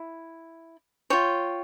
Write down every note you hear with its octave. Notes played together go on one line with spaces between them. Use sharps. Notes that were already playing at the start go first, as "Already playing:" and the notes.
Already playing: E4
F4 C#5 G5